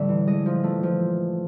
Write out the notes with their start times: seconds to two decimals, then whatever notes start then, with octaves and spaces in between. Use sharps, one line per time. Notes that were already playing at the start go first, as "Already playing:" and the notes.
Already playing: A1 D3 G3 E5
0.09 E3
0.27 G#3 D#5
0.46 F3
0.64 A3
0.83 F3